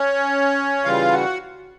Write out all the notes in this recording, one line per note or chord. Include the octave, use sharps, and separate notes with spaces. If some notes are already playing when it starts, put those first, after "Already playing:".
Already playing: C#4 C#5
C#3 E3 G3 F4 F5
F#4 F#5